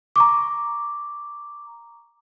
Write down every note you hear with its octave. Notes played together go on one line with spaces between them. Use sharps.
A#5 C#6 D6